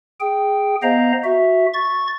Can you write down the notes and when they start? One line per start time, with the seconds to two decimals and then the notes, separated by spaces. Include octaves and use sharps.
0.20 G#4 G5
0.83 B3 C5 D#5 F5 A#5
1.24 F#4 E5
1.74 C#6 A6